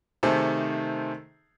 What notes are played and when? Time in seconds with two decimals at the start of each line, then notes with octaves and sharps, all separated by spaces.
0.23 C3 D#3 A3 G#4 C5 A5